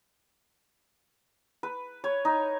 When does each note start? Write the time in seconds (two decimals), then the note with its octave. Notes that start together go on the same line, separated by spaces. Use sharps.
1.63 B4
2.04 C#5
2.25 D#4